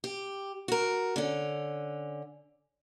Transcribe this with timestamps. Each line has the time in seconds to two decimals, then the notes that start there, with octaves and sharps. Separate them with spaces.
0.04 G4
0.68 F#4 A#4
1.16 D3 C#4